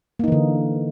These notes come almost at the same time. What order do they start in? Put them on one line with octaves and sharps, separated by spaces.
A#3 D#4 E3 D3